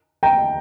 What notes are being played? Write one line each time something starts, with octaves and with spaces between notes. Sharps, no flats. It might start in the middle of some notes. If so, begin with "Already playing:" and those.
G5 A#5